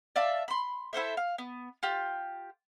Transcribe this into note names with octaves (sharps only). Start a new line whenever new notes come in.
D5 E5 F5 A5
B5 C6
E4 A4 C5 E5
F5
B3
F4 G4